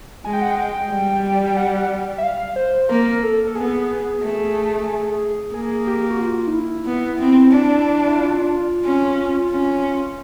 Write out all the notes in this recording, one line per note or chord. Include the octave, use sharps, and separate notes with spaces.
G#3 G#5
G5
F#5
G5
G3
G5
F#5
E5
F5
C5
A#3 A#4
A4
A4
B3 G#4
A3
A#3 G#4
G4
G4
F#4
F4
D#4
E4
B3
C4
D4
E4
F4
C#4
C#4